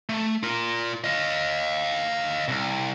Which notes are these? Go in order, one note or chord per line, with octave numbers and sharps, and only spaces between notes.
A3
F4 A#4
D#5 F5
C2